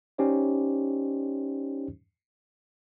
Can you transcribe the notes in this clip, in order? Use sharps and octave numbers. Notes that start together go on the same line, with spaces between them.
C#4 D#4 G4 C5 D5